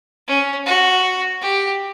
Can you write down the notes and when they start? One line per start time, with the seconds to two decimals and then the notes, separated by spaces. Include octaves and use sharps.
0.28 C#4
0.66 F#4
1.42 G4